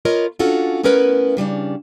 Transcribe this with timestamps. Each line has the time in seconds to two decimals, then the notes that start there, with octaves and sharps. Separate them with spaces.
0.05 F4 A#4 B4 C#5 D#5
0.39 C#4 D4 F4 F#4 A4
0.83 A3 B3 C#4 E4 A#4 B4
1.37 C#3 G3 C#4 D4